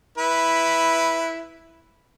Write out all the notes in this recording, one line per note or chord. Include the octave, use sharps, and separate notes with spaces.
E4 B4